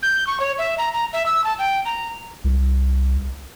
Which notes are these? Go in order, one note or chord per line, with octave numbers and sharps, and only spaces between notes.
G6
C#6
C#5
E5
A#5
A#5
E5
E6
A5
G5
A#5
C2